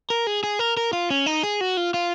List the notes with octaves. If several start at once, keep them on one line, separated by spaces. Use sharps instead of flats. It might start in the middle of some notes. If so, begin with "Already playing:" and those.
A#4
G#4
G#4
A#4
A#4
F4
C#4
D#4
G#4
F#4
F4
F4